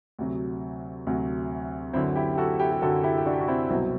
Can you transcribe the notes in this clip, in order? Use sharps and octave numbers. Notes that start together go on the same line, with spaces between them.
D2 C3 F#3
D2 C3 F#3
F#2 D3 F#3 C4 E4
E4 G4
G4
F#4 A4
E4 G4
G4
F#2 D3 F#3 F#4 A4
E4 G4
G4
D4 F#4
G4
F#4
C4 E4
C2 B2 F#3 C4 E4